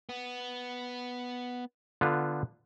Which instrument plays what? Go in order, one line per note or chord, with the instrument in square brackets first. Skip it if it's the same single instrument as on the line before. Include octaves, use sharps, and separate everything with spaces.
[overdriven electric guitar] B3
[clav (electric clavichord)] D3 B3 F4